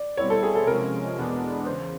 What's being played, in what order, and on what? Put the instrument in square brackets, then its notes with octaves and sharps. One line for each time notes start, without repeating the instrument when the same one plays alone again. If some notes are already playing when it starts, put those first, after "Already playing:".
Already playing: [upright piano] D5
[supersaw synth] B2 G3 C4 E4 [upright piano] C#5
[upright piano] A4
G#4
A4
[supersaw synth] C3 F3 G#3 C#4 [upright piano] A#4
[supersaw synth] E2 B2 G#3 B3 D4
[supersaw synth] E2 C#3 [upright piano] C5